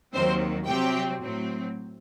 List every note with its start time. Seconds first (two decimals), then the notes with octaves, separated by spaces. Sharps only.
0.13 D#2 D#3 F#3 C4 C5
0.67 C3 F#3 C4 G4 G5
1.21 A2 F#3 C4